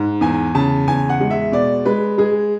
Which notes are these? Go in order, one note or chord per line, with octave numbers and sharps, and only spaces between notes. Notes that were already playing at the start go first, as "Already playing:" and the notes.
Already playing: G#2
E2 G#5
C#3 A5
E2 G#5
F#5
G#3
E5
B2 D5
G#3 B4
G#3 G#4